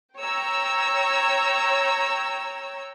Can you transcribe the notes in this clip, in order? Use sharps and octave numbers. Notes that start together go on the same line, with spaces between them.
C#5 G5 A#5 E6